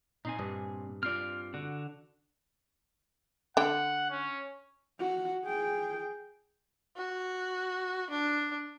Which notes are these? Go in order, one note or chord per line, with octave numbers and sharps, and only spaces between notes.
A#2 C4 D#4 G#5
G2 D4 D#5
C4 F4 D5 F6
D3 F#4
D3 F#5 G5
C#4
F#4
G#4 G5
F#4
D4